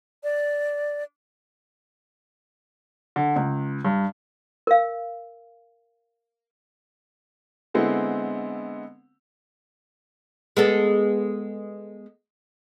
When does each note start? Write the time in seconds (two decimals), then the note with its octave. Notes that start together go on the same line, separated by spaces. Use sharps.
0.24 D5
3.16 D3
3.36 C#2
3.84 G2
4.67 A#4 F5
7.74 D3 G#3 B3 C4 E4
10.57 G#3 B3 A4